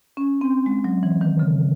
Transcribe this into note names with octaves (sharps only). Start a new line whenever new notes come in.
C#4
C4
G#3
F#3
E3
D#3
C#3